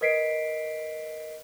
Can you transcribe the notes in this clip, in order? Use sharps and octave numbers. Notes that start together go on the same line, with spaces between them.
A#4 B4 D#5 B6 C7 D7